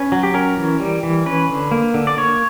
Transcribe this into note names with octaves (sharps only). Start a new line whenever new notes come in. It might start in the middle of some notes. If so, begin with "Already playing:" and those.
Already playing: C#4 B4
F#3
G4
C#4 A#4
E3
G3
E3
C#4 B4
D3
A#3
D3
D5
A#3 C#5